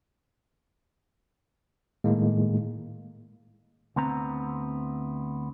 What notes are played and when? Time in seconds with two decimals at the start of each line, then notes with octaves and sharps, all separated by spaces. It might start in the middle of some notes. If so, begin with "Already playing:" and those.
2.04 A2 D#3 G#3 A#3
3.96 D2 B3 C4 A#5